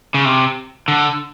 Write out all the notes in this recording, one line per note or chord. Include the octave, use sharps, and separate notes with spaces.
C#3
C3
D3